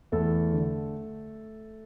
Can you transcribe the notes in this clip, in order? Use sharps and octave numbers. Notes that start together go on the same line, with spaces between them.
E2 A3 A4
D3